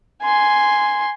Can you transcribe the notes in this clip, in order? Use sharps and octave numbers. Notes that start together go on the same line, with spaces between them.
G#5 C6